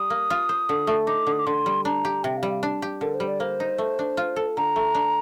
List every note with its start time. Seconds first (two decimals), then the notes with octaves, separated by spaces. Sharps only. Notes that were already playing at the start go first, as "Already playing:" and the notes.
Already playing: G3 D#6
0.10 A#3
0.30 F4
0.49 C5
0.69 D3
0.87 A3
1.07 D#4 D6
1.27 D3
1.32 D#6
1.39 D6
1.46 D3 C6
1.66 G3
1.85 D4 A#5
2.05 G4
2.23 C3 G5
2.37 F5
2.43 G3
2.50 F5
2.63 D4
2.82 G4
3.01 D3 A#4
3.14 C5
3.20 G3
3.28 D5
3.40 A#3 C5
3.60 D#4
3.78 A3
3.99 D4
4.17 F4
4.36 A4
4.57 D3 A#5
4.76 A3
4.95 D4